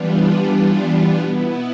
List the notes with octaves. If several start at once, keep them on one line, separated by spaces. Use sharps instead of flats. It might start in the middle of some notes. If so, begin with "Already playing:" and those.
Already playing: E3 G3 B3 D4 F4
B2 B3 E4